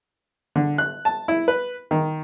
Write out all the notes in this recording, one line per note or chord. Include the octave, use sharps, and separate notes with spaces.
D3
F#6
A5
E4
B4
D#3